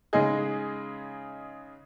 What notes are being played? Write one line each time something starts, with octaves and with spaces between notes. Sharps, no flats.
C#3 G#3 D#4 G#4 D#5